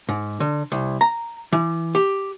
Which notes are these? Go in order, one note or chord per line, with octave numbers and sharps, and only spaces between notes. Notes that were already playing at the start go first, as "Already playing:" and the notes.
G#2
D3
C2
A#5
E3
G4